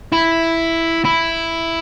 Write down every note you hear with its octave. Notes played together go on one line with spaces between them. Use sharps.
E4
E4